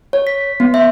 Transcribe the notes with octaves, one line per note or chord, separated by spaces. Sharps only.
C#5
B6
B3
E5